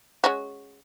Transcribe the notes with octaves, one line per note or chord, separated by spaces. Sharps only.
G#3 C#4 F#4